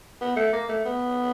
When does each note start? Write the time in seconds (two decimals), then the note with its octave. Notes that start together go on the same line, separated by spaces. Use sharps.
0.21 B3
0.36 A3
0.53 A#3
0.69 A3
0.85 B3